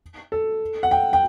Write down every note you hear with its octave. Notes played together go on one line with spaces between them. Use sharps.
A4
F#5
G5
G5